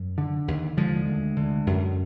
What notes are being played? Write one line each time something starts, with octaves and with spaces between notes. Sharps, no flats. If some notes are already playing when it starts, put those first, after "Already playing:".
Already playing: F#2
D3
D#2
D3 F3 G#3
D2
D3
F#2